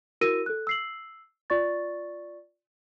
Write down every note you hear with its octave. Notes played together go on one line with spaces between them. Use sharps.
E4 F#4 A#4 E6 A#6 D#7
A4 F#6
E6 C7 F#7
F4 D5 C#6 A6